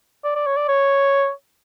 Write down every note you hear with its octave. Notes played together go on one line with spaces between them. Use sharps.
D5
D5
C#5
D5
C#5